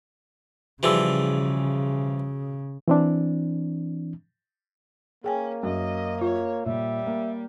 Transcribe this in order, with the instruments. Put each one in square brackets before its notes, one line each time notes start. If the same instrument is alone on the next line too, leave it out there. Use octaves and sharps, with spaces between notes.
[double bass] C#3 [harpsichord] E3 F3 G3 [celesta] F#4 G#4 E6
[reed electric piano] E3 C4 D4
[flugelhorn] A#3 [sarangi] C#4 [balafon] G#4 G5 G#5
[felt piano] F#2 [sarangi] D#5
[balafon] F4 [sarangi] C#5
[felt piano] A#2 [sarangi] G3 [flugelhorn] E5
[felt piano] A#3